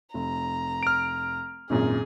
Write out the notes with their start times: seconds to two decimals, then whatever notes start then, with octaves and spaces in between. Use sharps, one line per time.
0.14 F1 A#5
0.83 F6 D7
1.70 G#1 F#2 A#2 G#4